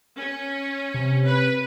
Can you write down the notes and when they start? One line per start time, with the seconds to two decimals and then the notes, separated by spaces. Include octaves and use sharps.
0.16 C#4
0.94 C3
1.26 B4